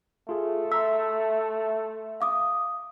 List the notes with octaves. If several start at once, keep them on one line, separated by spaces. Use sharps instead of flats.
A3 F4 G#4
E5 A#5 C6 E6
F5 D6 D#6